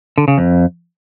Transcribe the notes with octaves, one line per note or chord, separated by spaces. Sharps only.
D3
C#3
F2